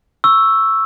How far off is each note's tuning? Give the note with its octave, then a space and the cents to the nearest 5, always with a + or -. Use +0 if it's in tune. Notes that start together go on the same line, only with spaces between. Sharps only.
C#6 +0 E6 +0